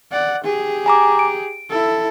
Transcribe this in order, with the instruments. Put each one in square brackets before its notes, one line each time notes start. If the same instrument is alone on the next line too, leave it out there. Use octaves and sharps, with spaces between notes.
[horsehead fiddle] D5 F#5
G4 G#4
[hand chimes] G#5 A#5 D6
D7
[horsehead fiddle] E4 A4